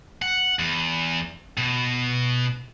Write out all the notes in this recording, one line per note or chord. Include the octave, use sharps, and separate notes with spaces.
F#5
E2
B2